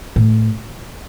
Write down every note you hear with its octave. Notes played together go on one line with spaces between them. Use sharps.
A2